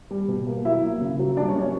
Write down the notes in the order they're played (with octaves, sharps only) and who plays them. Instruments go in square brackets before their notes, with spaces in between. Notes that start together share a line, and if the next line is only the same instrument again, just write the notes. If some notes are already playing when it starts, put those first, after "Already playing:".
[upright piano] G3
B2
A#3
F#3 E4 E5
A#3
C#3
F#3
G3 D4 D5
C#4 C#5
A#3
C#4 C#5